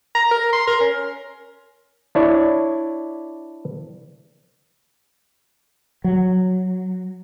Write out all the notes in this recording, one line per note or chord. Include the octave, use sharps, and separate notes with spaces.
A#5
A#4
C6
A#4
C#4
D4 E4 C#5 D5
F#3